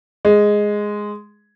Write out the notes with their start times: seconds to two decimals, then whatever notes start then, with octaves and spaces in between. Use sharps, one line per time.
0.25 G#3